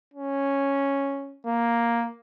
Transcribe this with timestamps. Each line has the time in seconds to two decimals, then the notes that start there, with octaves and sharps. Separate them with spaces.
0.14 C#4
1.47 A#3